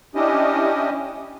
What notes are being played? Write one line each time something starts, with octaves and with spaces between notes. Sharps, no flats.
C#4 D4 E4 G4 D#5